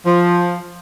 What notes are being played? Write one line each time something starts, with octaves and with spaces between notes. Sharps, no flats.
F3